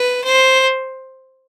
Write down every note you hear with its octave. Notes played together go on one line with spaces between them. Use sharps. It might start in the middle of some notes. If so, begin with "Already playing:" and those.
Already playing: B4
C5